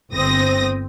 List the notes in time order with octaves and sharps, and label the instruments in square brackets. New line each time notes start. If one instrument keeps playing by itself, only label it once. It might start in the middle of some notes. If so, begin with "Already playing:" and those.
[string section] G1 C4 D#6 A#6